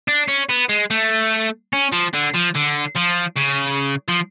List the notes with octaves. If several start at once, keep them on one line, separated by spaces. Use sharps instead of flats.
D4
C#4
B3
G#3
A3
C#4
F3
D3
F3
D3
F3
C#3
F3